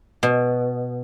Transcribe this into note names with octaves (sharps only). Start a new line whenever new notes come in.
B2